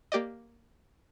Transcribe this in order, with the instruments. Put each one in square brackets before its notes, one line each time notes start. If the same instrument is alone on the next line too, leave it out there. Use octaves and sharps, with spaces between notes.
[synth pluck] A#3 G4 D5 D#5